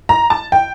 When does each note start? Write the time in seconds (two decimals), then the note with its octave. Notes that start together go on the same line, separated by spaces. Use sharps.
0.09 A#5
0.30 A5
0.52 G5